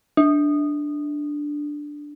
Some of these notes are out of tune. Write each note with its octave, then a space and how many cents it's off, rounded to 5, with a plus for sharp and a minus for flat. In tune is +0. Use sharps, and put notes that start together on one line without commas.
D4 +0